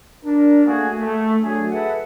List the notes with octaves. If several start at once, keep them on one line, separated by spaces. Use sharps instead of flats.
D4 A#4
A3 A#3 F#4 G#4
A3
F#3 A3 D4 G#4
G#4 A4 B4 E5 F#5 A5